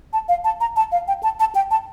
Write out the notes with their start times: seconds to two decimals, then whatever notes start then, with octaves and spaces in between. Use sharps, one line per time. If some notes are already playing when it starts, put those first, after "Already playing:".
0.13 A5
0.29 F5
0.44 A5
0.60 A#5
0.76 A5
0.92 F5
1.08 G5
1.23 A5
1.40 A5
1.55 G5
1.71 A5